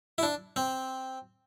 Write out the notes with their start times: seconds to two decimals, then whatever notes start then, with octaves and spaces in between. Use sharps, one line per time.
0.18 E4
0.23 D4
0.56 C4